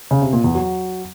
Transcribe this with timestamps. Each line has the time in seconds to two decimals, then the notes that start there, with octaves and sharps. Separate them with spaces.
0.11 C#3
0.22 C3
0.33 A#2
0.44 E2
0.55 F#3